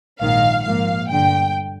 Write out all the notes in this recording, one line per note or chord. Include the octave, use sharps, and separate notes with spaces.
A#1 G#2 D#3 F5
A#1 G#2 F3 A#3 F5
G1 G2 D3 G5